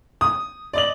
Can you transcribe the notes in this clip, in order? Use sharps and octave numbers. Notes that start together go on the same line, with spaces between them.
D#6
D5 D#5 F#7